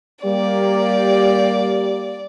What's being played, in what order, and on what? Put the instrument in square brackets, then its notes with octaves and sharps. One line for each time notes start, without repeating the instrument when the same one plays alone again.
[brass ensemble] G3 A#3 G4 [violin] D5